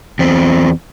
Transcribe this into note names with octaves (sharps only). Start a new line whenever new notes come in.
E2 C4